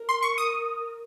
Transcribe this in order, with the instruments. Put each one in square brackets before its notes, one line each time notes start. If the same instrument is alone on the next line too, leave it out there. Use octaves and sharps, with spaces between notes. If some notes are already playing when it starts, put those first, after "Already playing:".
Already playing: [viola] A#4
[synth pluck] C6
C#6
D#6